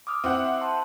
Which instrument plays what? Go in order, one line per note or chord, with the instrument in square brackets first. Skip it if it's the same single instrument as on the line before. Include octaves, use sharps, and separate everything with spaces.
[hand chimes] D6 D#6 F6
[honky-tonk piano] C4 E4 F#5 [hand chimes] E5 D6
[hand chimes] A5 C6